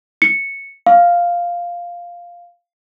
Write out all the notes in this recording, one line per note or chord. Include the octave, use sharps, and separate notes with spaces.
C#7
F5